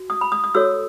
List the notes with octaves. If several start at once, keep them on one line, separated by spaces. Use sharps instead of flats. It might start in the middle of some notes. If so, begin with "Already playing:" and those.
Already playing: F#4
D#6
B5
D#6
D#6
F#4 A4 C#5 E6